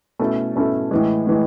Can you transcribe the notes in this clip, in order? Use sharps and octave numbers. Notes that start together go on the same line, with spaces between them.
B2 A3 C#4 E4 A4
B2 A3 C#4 E4 A4
A2 E3 G#3
A2 E3 G#3